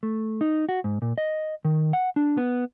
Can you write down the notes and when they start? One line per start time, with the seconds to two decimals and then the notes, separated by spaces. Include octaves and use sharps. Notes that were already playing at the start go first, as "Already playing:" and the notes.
0.03 A3
0.41 D#4
0.69 F#4
0.84 G#2
1.02 A#2
1.18 D#5
1.65 D#3
1.93 F#5
2.16 D4
2.37 B3